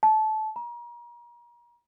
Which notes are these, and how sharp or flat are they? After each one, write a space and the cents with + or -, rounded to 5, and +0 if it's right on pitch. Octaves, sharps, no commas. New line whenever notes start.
A5 -20
A#5 +35